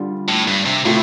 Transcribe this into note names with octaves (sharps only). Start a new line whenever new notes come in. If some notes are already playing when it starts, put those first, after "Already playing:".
Already playing: D3 G3 F4
A2
G2
C3
A2 C3 A3 F4